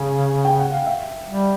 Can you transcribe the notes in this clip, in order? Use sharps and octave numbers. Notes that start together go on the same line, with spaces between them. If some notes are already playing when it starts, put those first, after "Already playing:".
Already playing: C#3 G#5
G5
F#5
F5
E5
G3